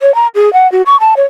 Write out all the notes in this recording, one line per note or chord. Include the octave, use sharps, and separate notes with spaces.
C#5
A#5
G#4
F#5
F#4
C#6
A5
C#5